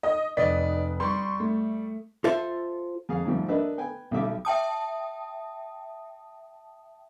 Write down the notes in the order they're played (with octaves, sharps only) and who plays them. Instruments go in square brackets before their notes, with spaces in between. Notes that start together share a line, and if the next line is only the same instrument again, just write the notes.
[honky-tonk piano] D#5 D#6
[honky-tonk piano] F1 B4 B6 [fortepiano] D5 D#5
[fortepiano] G3 [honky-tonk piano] C6 C#6
[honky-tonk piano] A3
[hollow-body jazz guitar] F4 A4 C5 E5
[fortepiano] F2 G#4 F5
G#2 F3 G3 A3
A#3 D4 A4 B4 D#5 E5
B3 G5 G#5
B1 G3 E5 D6
[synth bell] E5 G5 A5 D#6